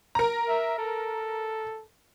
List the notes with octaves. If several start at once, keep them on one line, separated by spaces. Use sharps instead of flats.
A#4 A#5
E5
A4